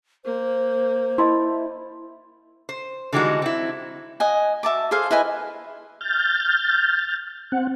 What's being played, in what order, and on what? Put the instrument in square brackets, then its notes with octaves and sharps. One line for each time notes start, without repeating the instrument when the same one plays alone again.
[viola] A#3 [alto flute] C5
[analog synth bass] E4 [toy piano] D#5 A5 C6
[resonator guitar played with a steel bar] C5
D3 E3 G3 G#3 D#4 F#4
C4 E4
[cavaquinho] D#5 F#5 G#5
F#4 E5 A5 D6
G#4 A4 C5 F5
E4 B4 D#5 G#5
[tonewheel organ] F6 G6 A6
C4 F#5